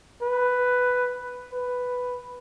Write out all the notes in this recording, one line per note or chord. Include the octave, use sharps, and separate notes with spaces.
B4
B4